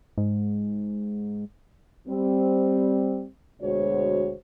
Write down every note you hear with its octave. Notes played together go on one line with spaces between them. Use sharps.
G#2
G3 C4
D2 B2 G#3 F#4 C5 C#5